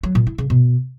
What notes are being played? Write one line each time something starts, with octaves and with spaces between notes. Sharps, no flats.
F#3
A#2
E4
C#3
B2